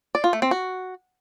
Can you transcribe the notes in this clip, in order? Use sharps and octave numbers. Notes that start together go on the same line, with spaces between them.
D5
F4
A3
C4
F#4